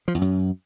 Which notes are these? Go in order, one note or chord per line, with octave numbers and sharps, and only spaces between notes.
F3
E2
F#2